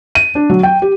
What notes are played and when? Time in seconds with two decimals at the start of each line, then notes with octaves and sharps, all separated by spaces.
0.15 D#7
0.35 D4
0.50 F#3
0.63 G5
0.82 G4